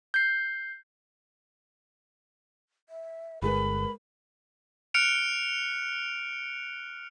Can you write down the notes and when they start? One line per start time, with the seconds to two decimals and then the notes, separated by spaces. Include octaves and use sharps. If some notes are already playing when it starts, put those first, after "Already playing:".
0.14 G6 C7
2.89 E5
3.42 G1 G#3 G#4 A#4 B4 B5
4.94 F6 F#6 C#7 D7 F7